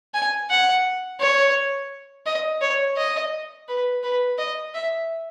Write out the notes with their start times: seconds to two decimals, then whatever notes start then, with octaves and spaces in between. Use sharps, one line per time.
0.14 G#5
0.50 F#5
1.20 C#5
2.26 D#5
2.61 C#5
2.97 D#5
3.68 B4
4.03 B4
4.38 D#5
4.74 E5